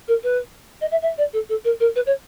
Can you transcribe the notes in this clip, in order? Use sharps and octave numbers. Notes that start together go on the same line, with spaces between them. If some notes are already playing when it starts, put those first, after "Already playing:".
A#4
B4
D#5
E5
E5
D5
A4
A4
A#4
A#4
B4
C#5